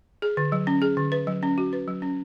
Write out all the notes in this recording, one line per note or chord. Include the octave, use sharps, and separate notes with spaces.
G#4
D3
F#3
C#4
G#4
D3
B4
F#3
C#4
F#4
B4
F#3
C#4